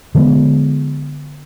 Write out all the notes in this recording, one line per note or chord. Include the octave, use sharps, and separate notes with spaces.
D3 F3 G#3 B3